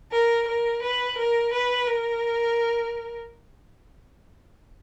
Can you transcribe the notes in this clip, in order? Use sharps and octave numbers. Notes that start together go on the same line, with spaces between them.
A#4
A#4
B4
A#4
B4
A#4